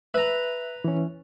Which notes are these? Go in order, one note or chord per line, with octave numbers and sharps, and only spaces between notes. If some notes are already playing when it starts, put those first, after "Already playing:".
B4 E5 A#5 F#6
E3 C#4